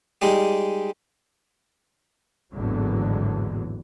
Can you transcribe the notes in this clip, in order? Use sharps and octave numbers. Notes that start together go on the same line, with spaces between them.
G3 G#3 D#4 G4
G#1 E2 A2 D3 F#3